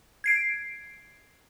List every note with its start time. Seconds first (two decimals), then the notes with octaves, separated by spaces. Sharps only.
0.24 G#6 C7 D7